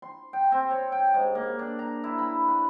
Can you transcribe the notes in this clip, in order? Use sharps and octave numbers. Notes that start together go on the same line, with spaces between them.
C6
G5
C4
C#5
G5
G#2
A#3
D4
A#5
E4
B5
B4